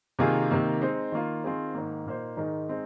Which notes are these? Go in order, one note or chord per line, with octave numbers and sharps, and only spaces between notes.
C3 D#3 A#3 F4 G#4
C3 D#3 A#3
G#3 C4 D#4 C5
D#3 A#3 F4
D#3 C4 F4 G#4 C5
G#2 D#3 A#3
A#2 A#3 D#4 C5
G#2 D#3 G#3 D#4 A#4
G#3 C4 D#4